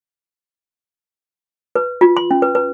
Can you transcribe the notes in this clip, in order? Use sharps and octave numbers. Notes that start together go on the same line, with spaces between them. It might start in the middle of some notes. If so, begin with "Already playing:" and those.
B4
F4
C6
C#4
B4
B4